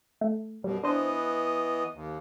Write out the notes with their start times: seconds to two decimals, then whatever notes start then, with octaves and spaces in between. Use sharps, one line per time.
0.21 A3
0.64 F#2 B2 G3
0.83 E3 B3 D4 C5 D#5
1.94 D#2